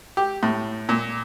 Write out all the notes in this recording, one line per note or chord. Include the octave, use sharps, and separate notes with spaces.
G4
A2
A#2